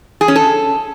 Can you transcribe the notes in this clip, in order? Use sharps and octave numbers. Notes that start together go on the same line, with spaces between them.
G#4
C#4
A4